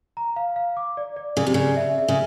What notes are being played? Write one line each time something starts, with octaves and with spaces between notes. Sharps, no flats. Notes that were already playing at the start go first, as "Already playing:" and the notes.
A#5
F5
F5
D6
D5
D5
C#3 D5
C3
C#3 D5
E5
E5
C#3